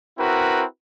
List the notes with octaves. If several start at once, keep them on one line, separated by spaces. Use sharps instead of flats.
C4 E4 F#4 A#4 B4